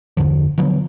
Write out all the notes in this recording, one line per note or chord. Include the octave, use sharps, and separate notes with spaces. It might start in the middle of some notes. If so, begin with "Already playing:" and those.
G1 E2 D3 F3
D3 F3 F#3 B3